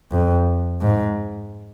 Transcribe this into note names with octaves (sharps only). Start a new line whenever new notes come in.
F2
G#2